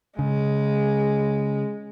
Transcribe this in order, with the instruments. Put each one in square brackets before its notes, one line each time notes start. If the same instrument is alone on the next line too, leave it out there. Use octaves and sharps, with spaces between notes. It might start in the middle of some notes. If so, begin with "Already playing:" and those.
[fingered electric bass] C#3 [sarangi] G#3